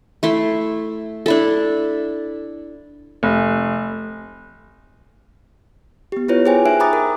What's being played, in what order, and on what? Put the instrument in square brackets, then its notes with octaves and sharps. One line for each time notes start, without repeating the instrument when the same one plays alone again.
[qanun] A3 E4 C6
D4 E4 A4
[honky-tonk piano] F1
[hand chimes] B3 G4
E4 F4 B4 C#5
G#4 B4 C5 G5 G#5
D#4 E5 G#5 F#6 D7
G5 A#5 B5 D6 D#6 A6
A#4